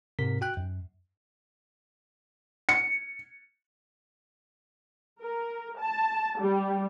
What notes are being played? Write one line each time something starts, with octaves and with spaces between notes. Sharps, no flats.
G#2 C3 A#4 B6
F#4 G5 F#6
F#2
C#7
A#4
A5
G3